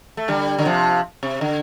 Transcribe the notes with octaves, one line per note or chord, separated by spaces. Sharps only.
A3
D3 G3
D3
C3 F3
C3
D3